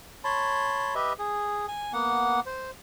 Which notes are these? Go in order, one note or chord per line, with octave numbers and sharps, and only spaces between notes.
C#5 A5 B5 C6
G4 B4 D#5 E5
G#4
G#5
A#3 B3 F#5
C5